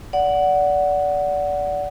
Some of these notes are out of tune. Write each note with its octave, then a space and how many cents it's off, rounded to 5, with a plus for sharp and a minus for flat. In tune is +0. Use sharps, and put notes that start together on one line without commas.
D5 -20 F#5 +0